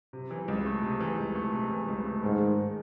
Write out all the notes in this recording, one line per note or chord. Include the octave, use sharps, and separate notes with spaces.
C3
E3
C#2
A3
C3
E3
C#2
A3
C3
E3
C#2
A3
G#2 D#3
G#3